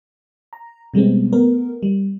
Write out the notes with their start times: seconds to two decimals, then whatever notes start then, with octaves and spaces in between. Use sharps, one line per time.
0.53 A#5
0.94 B2 G3 G#3 B3 C4
1.33 A3 B3 A#4
1.83 G3